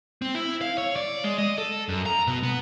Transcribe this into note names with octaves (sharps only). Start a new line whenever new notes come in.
C4
E4
F5
C#5
D5
G#3
D#5
A4
F#2
A#5
B2
B3